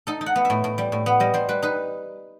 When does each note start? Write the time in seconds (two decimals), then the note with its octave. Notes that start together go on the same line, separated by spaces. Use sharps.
0.07 D#4 A4
0.21 D#4
0.26 F#5
0.36 B3
0.45 E5
0.50 A2
0.64 A2
0.78 G3
0.92 A2
1.06 B3
1.20 G3 D#5
1.34 G3 C5
1.49 G3 B4
1.62 D#4 B4